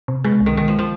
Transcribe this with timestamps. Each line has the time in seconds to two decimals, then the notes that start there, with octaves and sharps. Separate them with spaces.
0.08 C3
0.24 B2 G#3
0.41 C2
0.46 D#3
0.57 D#3 G#3
0.68 F3
0.79 F3